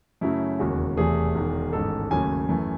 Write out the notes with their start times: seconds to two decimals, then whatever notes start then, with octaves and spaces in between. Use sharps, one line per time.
0.21 F#2 C#3 F#3 A3 E4
0.59 E1 D#2 C#3 G#3 F#4
0.97 E1 E2 C3 E3 A3 G#4
1.35 E1 E2 D#3
1.73 A1 G#2 D#3 A4
2.11 D#2 C#3 F#3 A3 G#5
2.49 F#2 E3 A3